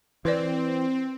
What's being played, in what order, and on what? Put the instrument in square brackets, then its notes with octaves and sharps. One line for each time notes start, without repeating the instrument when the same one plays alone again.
[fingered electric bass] E3 [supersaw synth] C4 [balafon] B4 C5 D5